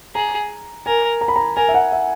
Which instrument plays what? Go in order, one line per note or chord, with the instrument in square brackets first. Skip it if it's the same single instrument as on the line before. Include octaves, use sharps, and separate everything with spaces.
[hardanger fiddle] G#4 [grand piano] A#5
[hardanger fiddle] A#4 [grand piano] G#5
[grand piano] A#5
B5
A#5
[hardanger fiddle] A#4 [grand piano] G#5
[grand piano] E5
F#5
E5